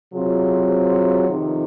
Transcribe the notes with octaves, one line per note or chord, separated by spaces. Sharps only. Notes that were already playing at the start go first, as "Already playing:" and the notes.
C3 F#3 C4 F4 G#4
F2 C3 D#3